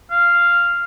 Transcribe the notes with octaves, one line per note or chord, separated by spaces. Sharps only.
F5